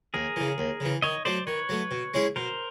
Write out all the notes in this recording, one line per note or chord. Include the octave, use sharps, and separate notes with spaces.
D#2 G#4 A#4
C#3 E3
D#2
C#3 E3
D#3 C#5 D#5
F#3 A3 C5 D5
D#3 B4 C#5
F#3 A3
B2
G#3 C#4 E4 G#4
B2 A#4 C5